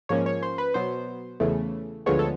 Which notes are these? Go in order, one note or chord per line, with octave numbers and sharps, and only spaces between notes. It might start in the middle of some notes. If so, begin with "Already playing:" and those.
G#2 F3 A#3 C#4 C#5
C#5
C5
B4
B2 F#3 B3 C5
E2 C#3 E3 A3
D2 D3 F3 G#3 B3 C#5
A4